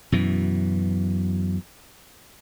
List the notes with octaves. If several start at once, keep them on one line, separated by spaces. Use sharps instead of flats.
F#2 B2 E3